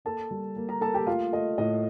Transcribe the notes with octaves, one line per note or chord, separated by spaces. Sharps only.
A#3 A4 A5
G3
A#3
A#4 A#5
A#3 A4 A5
G4 G5
A3 F4 F5
A3 D#5
A2 D#5